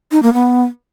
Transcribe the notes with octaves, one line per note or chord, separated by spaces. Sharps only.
D#4
A#3
B3